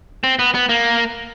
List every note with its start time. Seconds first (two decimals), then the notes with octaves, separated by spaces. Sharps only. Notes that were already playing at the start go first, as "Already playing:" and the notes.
0.24 C4
0.39 B3
0.55 B3
0.69 A#3